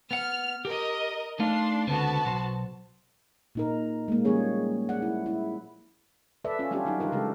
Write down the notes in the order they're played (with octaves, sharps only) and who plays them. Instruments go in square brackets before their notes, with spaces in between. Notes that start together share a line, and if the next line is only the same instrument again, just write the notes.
[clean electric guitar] B3 F#5 [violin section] F6
[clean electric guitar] G4 [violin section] A#4 D#5
[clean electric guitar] A3 D#4 F5 [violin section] D4 C6
[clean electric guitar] C#2 D3 C4 [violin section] B3 F#4 A5
[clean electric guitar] B1 C5
[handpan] A#2 D#4 A#4
G#3 A#3
F3 G3 A#3 C#4 G#4 C#5
D5 F#5
E4
E4
A4 B4 D5 E5
C#4 F4
G3 B3 C#4 D4 F4 G4
F#3 D#4 F#4
E3 G3 D#4 F4 A#4
C#3 G#3 D4 G4 A4